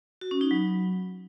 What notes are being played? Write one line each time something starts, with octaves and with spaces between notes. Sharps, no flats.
F#4
C#4
D#4
F#3